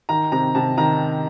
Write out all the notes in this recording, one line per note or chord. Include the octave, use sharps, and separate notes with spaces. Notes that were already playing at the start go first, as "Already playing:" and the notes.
D#3 A#5
C3 A#5
C3 A5
D#3 A#5